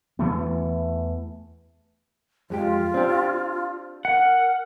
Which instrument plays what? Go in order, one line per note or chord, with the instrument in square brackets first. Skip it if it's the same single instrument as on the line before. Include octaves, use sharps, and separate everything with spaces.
[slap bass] E2 E3 A3 B3
[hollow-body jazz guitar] F2 G#3 G4 [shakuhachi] F4
[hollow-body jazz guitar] C4 D4 G4
[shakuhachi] A#4 [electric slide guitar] F#5